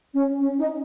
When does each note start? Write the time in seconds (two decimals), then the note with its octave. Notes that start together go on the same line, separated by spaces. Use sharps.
0.13 C#4
0.40 C#4
0.58 D#4